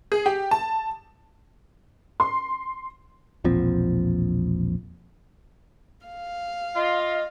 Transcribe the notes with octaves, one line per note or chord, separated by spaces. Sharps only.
G#4
G4
A5
C6
E1 A#1 F3 C4
F5
F4 D#5